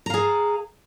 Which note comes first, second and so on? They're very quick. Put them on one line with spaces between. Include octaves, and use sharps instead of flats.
A#5 F5 G#4